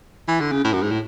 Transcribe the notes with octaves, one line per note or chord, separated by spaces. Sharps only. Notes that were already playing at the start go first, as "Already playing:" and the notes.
E3
D3
C#3
A2
F#2
G#2
A2